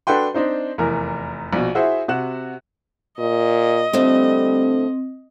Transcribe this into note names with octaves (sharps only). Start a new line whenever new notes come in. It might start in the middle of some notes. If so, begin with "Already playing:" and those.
D4 F#4 A4 B4 G5 C6
C4 D4 D#4 C5
F1 E2 A#4
A#1 B2
E4 F#4 G#4 C5 E5
C3 F#4 F#6 E7
A#2 D#5
D3 F3 G3 A3 C4